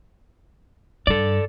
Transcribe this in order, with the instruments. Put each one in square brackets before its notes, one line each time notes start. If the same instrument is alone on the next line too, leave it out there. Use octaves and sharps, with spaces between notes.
[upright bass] G2 [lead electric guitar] A4 D5